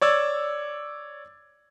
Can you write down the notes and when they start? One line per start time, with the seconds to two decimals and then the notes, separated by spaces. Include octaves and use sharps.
0.01 C#5 D5 E6 G#6